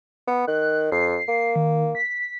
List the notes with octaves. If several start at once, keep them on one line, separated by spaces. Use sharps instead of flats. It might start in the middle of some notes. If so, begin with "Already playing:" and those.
B3
D#3 F#6
F2 C7
A#3
D#3
B6